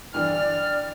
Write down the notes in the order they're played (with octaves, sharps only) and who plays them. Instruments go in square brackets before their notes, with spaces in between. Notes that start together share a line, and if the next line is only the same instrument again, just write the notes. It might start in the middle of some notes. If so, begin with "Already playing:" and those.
[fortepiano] G2 D3 E3 [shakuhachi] D5 [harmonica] F6